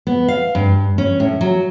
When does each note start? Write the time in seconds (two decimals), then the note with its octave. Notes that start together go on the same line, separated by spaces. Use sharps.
0.07 B3
0.28 F5
0.55 G2
0.98 C#4
1.20 A2
1.41 F#3